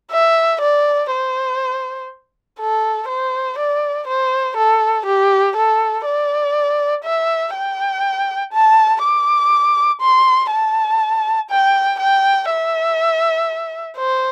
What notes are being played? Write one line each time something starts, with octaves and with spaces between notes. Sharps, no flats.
E5
D5
C5
A4
C5
D5
C5
A4
G4
A4
D5
E5
G5
A5
D6
C6
A5
G5
G5
E5
C5